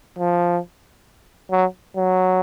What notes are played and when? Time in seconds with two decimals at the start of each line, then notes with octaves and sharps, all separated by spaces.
0.19 F3
1.51 F#3
1.96 F#3